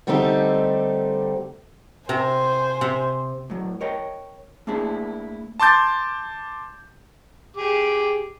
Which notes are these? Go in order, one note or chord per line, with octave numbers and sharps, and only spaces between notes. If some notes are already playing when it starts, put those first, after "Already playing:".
D3 G3 A3 C4 D#4 G4
C3 C5 G#5 A#5
C3
A2 F#3
A#4 C#5 D#5 G5
A3 A#3 D4 E4 G#4
A5 C6 D6 G6 A6
G4 G#4 D6